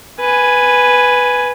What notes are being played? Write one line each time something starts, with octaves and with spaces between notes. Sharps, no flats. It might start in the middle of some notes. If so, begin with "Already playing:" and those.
B4 G#5